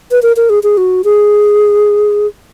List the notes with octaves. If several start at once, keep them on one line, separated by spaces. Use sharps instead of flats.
B4
A#4
A#4
G#4
G#4
F#4
G#4